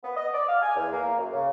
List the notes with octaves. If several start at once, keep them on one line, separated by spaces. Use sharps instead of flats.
B3
D#5
D5
F5
G#5
E2
A#3
F#2
C#3